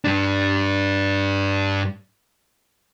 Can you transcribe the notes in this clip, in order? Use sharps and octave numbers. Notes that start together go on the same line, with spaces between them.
G2 D4